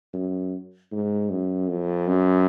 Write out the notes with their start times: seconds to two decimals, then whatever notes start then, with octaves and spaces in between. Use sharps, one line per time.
0.13 F#2
0.92 G#2
1.30 F#2
1.69 F2
2.07 F#2